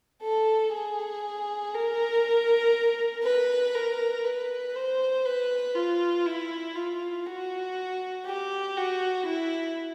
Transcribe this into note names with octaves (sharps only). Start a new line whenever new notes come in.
A4
G#4
A#4
B4
A#4
B4
C5
B4
F4
E4
F4
F#4
G4
F#4
E4